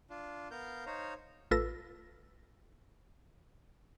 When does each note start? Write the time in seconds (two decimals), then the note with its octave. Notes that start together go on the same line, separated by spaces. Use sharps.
0.10 D4 F4
0.51 B3 A#4 F5 G6
0.86 D#4 C5 C#5 F5 A#5
1.51 A1 F4 A4 B4 E6 A#6